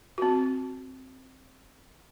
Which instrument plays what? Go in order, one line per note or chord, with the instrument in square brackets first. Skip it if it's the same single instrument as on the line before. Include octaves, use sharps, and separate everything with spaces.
[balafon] C4 F#4